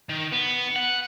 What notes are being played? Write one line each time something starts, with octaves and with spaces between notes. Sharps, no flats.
D#3
B3
F#5